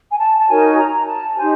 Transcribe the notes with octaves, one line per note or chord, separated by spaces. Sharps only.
G#5
A5
A5
D#4 F#4 A#4 C#5 G#5
A#5
A5
D#4 G4 C5 G#5